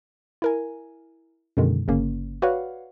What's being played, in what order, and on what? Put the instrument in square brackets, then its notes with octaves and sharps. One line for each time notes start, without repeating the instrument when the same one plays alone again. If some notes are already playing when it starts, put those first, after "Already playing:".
[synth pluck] E4 A#4 G#5
F#2 B2 D3 D#3 G#3
G1 C#3 A#3 C#4
F#4 B4 C#5 D5 F5 F#5